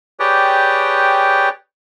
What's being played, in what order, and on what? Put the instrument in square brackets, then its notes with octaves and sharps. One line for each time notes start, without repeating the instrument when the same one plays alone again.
[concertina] G4 G#4 B4 C#5 D5 G5